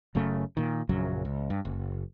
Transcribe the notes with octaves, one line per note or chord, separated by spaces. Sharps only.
F#1 F#2 C#3 A3
A#2 D#3
A#1 F#2 C#3 F#3
C#2
G2
F#1